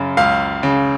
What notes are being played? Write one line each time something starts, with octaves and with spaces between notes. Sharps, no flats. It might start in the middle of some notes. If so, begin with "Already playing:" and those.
Already playing: F#2 C#3
C#2 F5
C#3